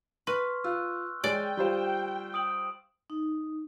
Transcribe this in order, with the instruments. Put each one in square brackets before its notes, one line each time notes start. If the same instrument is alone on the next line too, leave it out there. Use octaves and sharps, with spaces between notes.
[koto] B4 [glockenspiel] C6 C#6 F6
[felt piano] F4 [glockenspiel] E6 F#6
[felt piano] G#3 C#5 [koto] D5 [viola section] G5
[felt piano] G3 F4 C5
[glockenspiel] D#6 D7 F#7
[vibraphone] D#4